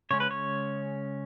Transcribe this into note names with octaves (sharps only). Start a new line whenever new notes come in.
C#3 G#3 C#4 C#5
B4
C#5